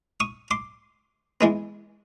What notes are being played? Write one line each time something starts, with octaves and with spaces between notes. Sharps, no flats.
C#6 D#6
C6 D6
E3 G#3 B3